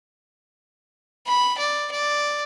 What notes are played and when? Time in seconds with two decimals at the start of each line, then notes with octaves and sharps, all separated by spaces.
1.27 B5
1.58 D5
1.92 D5